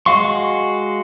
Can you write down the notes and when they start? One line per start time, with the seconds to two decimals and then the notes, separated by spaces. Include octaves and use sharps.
0.06 G#3 F#4 F5 C6 C#6